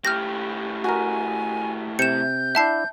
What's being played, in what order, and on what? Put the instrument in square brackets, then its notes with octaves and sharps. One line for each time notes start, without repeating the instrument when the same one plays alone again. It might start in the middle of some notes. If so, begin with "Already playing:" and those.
[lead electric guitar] A2 G4 [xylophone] F6 G6 A#6
[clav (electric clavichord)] F#4 A#4 [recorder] G#5
[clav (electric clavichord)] C3 [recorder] G6 [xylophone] C#7 E7
[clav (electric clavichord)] D4 E4 F#5 [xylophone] E5 A5 C7